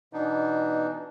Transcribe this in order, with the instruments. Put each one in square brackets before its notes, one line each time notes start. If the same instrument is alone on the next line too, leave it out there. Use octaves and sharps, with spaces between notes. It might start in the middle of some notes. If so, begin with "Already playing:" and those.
[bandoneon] B2 E3 B3 D4 D#4